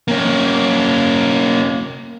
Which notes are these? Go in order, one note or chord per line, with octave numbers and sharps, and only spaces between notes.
A#3 C#4